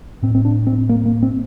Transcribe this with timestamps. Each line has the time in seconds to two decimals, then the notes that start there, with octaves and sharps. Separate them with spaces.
0.22 A2 C4
0.35 C4
0.45 D4
0.67 C4
0.89 A#3
1.06 A#3
1.23 C4